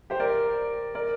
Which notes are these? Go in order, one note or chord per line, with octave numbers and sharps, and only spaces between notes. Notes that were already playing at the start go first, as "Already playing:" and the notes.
G4 C5
A#4 D5
A#4 D5